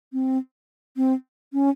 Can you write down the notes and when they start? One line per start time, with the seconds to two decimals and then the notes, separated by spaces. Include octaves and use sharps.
0.13 C4
0.97 C4
1.53 C#4